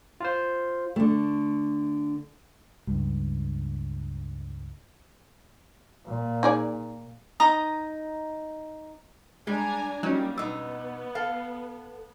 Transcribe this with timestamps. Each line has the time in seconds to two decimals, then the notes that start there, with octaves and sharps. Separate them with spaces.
0.20 F4 C5
0.96 D3 A3
2.87 C#2 G2
6.07 A#2
6.43 D#4 G#4 D5
7.40 D#4 A#5 D#6
9.47 G3 G#3 D4 G#5 A#5
10.03 F#3 G3 A#3 C#4 D#4
10.38 B2 B3 D#4 E6
11.15 A4 F5